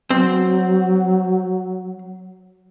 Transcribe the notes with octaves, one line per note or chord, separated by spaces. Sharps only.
F#3 C4